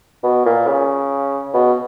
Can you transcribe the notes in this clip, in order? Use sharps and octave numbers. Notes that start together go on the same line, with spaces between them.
B2
A#2
C#3
B2